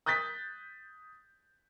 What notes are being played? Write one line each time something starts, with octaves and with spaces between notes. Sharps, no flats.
D#6 F#6 G6 A6 B6